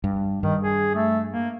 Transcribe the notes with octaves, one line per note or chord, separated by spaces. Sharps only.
G2
G2 D#3
G#4
A3
A#3